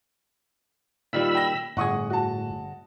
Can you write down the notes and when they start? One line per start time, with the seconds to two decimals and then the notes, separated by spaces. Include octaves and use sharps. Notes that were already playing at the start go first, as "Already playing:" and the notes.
1.13 A#2 D#3 G3 F4 B5 E6
1.35 G5 A#6
1.77 G1 A2 G#4 F#5 C#6 D#6
2.10 F#4 A5